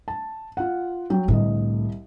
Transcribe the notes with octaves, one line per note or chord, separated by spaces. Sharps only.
A5
F4 F#5
F#3 G5
C2 A2 D3 D#5